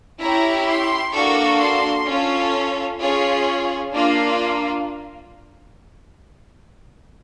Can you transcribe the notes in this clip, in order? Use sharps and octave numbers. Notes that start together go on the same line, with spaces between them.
C#4 E4 G4 A#5
C6
A#3 D4 F#4 A4 C#6
C6
C#4 F4 A4
C#4 F4 G#4
A#3 D4 F4